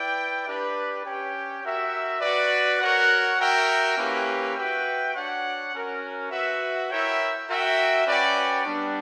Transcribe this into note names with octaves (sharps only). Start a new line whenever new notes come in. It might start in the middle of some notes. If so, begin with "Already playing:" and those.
Already playing: E4 B4 D5 G5
D4 G4 B4 D5
C#4 G4 C#5 G5
F#4 A#4 E5 G5
F#4 B4 D5
F#4 A#4 C#5 F#5
F#4 A#4 E5 G5
A#3 C#4 E4 G4 B4
F#4 B4 E5 G5
D4 F#4 C#5 F#5
C#4 F#4 A#4
F#4 B4 E5
E4 A#4 C#5 E5 G5
F#4 A#4 E5 G5
C#4 F#4 B4 D5 G5
G3 B3 D4